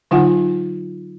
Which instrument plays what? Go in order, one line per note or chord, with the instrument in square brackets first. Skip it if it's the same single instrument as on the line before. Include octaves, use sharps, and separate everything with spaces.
[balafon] D3 F#3 D#4 F4 F#5 G#5